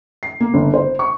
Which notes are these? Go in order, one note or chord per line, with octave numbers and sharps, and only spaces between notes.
C7
A#3
G1
C5
C#6